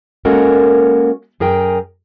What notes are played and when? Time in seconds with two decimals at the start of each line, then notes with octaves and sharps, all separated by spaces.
0.25 G#3 A#3 C#4 F#4 A4 A#4
1.40 F#2 G#4 A#4 G5 G#5